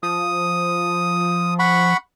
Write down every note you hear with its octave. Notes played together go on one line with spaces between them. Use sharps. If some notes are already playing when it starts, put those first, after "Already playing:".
F3 D#6
F#5 B5 C#6